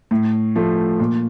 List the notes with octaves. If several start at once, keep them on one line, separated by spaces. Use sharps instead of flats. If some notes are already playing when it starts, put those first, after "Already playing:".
A2
F3 A3
A#2